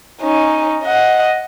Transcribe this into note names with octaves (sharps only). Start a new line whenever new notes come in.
C#4 D#4
D#5 F#5